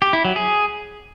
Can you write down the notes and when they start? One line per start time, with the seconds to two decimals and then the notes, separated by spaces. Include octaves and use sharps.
0.02 G4
0.13 E4
0.25 F#3
0.36 G#4